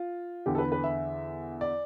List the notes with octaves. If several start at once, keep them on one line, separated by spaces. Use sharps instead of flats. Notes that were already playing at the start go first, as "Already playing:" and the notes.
Already playing: F4
E2 D3 G4
A4
B4
B4
E5
D5